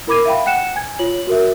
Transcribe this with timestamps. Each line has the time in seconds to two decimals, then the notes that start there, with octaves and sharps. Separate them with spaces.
0.07 E4 A#4 B5 D6 G#6 D#7
0.25 E5 F5 G5 B5
0.46 F#5 G5 F#6 C#7 E7
0.76 G#5 G#6
0.99 F4 C#5 F#7
1.27 F#4 A#4 E5